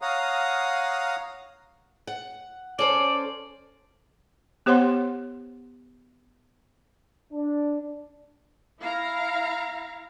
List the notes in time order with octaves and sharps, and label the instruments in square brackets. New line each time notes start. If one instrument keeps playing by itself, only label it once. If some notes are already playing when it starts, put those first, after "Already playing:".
[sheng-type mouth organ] C#5 F#5 [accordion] F5 A#5 D#6
[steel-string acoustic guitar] F#5
[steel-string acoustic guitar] C#4 A4 C5 [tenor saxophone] D5
[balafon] B3 G4 C5 C#5 F#5 C6
[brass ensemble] D4
[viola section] E4 F5 A#5